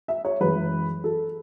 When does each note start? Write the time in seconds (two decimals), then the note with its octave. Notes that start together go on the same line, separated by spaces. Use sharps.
0.08 E5
0.25 C#5
0.40 F#2 E3 G#3 B4
1.04 A4